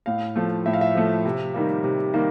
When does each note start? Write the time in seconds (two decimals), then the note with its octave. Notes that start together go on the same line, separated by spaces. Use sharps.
0.06 A2 F5
0.36 F3 A3
0.66 A2 E5
0.73 F5
0.81 E5
0.95 F3 A3
1.25 C3
1.54 D#3 G3 A#3
1.84 C3
2.14 D#3 G3 A#3